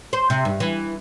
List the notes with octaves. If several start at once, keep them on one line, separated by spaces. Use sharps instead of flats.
C5
C3
G2
E3